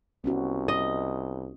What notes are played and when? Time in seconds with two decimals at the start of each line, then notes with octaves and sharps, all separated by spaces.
0.24 C2 B3 C#4 F#4
0.68 D#5